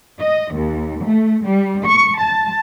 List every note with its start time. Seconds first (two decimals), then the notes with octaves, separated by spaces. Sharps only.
0.21 D#5
0.53 D#2
1.05 A3
1.44 G3
1.85 C#6
2.19 A5